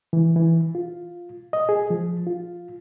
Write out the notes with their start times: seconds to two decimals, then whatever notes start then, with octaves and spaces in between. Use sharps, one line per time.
0.13 E3
0.36 E3
0.75 F4
1.53 D#5
1.69 G#4
1.90 F3
2.27 F4